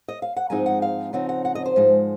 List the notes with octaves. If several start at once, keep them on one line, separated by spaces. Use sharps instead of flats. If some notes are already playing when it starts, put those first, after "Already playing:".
D#5
F5
F#5
G#2 F3 G#3 C4 D#4 G#5
F#5
F5
C#3 F3 C4 D#4 F#5
F#5
F#5
D#5
C5
G#2 F3 G#3 D#4